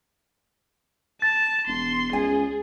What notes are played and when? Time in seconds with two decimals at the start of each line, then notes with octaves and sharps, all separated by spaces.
1.22 A5 A6
1.67 E1 C6
2.13 C#2 G#4 G#5